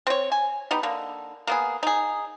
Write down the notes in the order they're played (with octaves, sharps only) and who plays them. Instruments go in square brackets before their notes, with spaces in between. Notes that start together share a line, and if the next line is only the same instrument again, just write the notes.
[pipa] C4 C#5
G#5
B3 D#4 G4
D3 A#3
A#3 B3 G#4
D#4 G#4